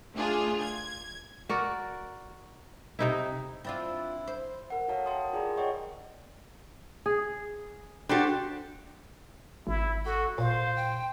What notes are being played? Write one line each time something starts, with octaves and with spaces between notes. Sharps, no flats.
A3 D4 F4 G#4
G#6
F#4 A#4 D5
C3 D#4 E4
C4 D4 E4 F4
C5
A#4 F#5
F#4 A4 C#5 F5 A5 A#5
E5 F#5 G5 A5 C6 D#6
F4 G#4 A#4 D5 G#5 A#5
G4
C#5 D#5 F#5 G5 C#6
G#4
D4 F#4 G4 A4 C5
G#1 E4
F#4 A4
A#2 C5 F5
G5